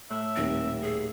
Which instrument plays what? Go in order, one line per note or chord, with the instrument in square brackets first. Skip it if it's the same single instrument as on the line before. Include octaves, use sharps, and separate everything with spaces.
[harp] A2 G5 F#6 [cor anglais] E5
[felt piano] D#1 D#2 D#3 [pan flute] C4
[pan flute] G#4